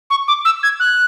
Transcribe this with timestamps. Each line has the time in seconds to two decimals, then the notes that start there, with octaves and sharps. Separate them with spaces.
0.10 C#6
0.28 D6
0.45 E6
0.63 G#6
0.80 F#6